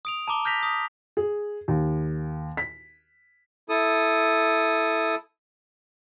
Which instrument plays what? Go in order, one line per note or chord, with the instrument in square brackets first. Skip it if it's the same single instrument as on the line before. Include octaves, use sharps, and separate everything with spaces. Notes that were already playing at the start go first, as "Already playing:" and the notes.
[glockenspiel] D#6 D7 F7
A5 A#5 D6 G7
F6 G6 A#6 B6 F7
D#6 B6
[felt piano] G#4
D#2
B6
[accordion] E4 A4 D#6